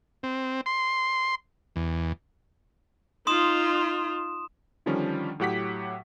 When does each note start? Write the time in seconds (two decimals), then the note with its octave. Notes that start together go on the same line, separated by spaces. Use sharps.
0.23 C4
0.66 C6
1.76 E2
3.27 D#4 F4 C6 D#6 E7
4.86 D3 D#3 F3 G3 C#4 D4
5.40 A2 F#3 G4 F#5 D6 B6